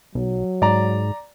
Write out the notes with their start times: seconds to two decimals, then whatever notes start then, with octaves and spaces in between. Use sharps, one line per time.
0.15 B1 F#3
0.62 G#2 D5 A#5